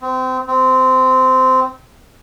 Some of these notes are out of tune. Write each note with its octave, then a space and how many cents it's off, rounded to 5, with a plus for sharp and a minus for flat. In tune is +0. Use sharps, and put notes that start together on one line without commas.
C4 -25
C4 -15